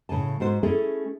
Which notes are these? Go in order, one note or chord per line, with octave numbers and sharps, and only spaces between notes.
A2 C#3 G#5 A5
G#2 F#4 C5
A3 C#4 E4 G#4 A4